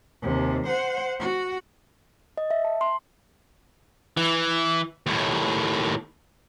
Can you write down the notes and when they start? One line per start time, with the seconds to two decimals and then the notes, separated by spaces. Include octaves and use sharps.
0.22 D#2 C3
0.66 C5 F#5
1.19 F#4
2.37 D#5
2.51 E5
2.65 A5
2.81 C6
4.17 E3
5.07 D#2 A2